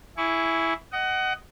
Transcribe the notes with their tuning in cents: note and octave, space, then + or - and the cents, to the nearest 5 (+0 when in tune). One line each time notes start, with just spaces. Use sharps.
E4 +0 G#4 +0 C#6 +30
D#5 +0 F#5 +25